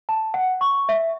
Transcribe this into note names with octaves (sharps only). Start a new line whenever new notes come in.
A5
F#5
C#6
E5